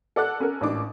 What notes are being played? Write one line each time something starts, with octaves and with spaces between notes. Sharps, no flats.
A4 D5 F#5 F#6
C#4 A4 A#4
A1 G#2 D4 D6